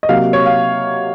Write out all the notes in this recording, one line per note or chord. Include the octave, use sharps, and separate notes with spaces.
D#5
C3 F#3 A#3 F5
C#5
F5